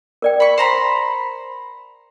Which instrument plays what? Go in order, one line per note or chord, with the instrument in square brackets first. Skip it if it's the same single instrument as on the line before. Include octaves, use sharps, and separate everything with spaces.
[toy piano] A#4 D5 G5
[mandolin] B5 C#6
C5 A#5 B5